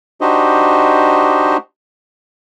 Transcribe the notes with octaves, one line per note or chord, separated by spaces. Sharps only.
D4 D#4 F#4 G4 C5 D#5